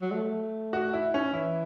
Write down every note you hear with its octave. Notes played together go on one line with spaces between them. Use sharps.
F#3
A3
F#4
E4
C#4
E3 E4